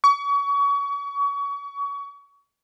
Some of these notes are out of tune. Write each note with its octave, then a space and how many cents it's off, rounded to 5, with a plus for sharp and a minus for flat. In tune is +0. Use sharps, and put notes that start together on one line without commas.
C#6 +30